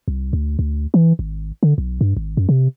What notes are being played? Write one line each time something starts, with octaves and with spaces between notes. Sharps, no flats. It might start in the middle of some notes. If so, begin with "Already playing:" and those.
C2
D2
D2
E3
G#1
D3
B1
G2
G#1
F#2
C3